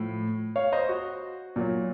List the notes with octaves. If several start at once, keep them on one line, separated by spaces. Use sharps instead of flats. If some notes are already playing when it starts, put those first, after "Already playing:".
Already playing: A2 F3
C#5 F5
C5 D#5
F#4
A#2 F#3